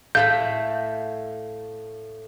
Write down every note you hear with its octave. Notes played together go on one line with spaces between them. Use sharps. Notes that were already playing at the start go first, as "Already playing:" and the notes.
A2 A3 F5 B5 G6